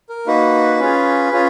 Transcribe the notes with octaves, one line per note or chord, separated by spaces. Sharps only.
A#4
A#3 D#4 F#4 B4
C#4 F4 G#4
C#4 F4 G#4